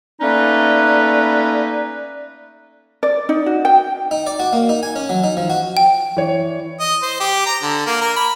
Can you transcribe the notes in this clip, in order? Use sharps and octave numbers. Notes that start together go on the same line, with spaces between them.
A3 A#3 C#4 D#4 B4 D5
D5
D#4
F#4
G5
D#4
D5
F#4
A#3
D#4
G#5
C#4
F#3
D#4
F3
F#4
G5
E3 C#5
D#5
C5
G4
A#5
D3
A#3
A#4
B5